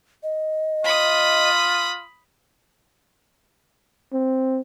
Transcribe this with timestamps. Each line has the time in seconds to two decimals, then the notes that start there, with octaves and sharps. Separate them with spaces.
0.23 D#5
0.84 F4 B5 D#6
4.13 C4